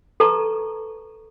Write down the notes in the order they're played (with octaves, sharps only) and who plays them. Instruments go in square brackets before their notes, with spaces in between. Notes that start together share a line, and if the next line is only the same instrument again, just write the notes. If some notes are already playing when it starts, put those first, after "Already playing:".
[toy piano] A4 B4 A5 A#5 C#6